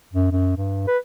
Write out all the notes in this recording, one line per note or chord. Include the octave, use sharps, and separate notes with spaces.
F#2
F#2
G2
B4